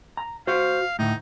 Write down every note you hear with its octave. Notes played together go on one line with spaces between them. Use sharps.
A#5
F#4 C5 F5
D2 A2 D#4